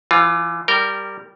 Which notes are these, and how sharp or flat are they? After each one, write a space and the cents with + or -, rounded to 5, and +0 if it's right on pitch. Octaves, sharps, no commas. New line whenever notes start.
E3 +30 F4 +5
G3 +0 A#4 -15 G5 -20